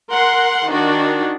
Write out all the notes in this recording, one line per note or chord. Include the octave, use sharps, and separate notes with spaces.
A#4 F#5 C6
D#3 D4 F#4